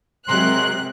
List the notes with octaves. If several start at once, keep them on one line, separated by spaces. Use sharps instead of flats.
C3 F#3 G#3 A#4 C6 F#6